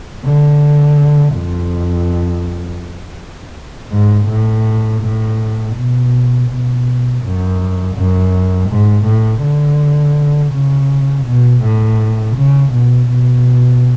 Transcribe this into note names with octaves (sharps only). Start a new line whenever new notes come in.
D3
F2
G#2
A2
A2
B2
B2
F#2
F#2
G#2
A2
D3
C#3
B2
A2
C#3
B2
B2